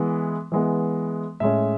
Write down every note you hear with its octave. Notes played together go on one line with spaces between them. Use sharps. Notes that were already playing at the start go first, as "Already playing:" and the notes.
Already playing: E3 G#3 B3
E3 G#3 B3
A2 G#3 C#4 E5